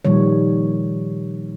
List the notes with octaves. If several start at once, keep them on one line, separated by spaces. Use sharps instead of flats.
A#2 D#3 F3 G3 C#5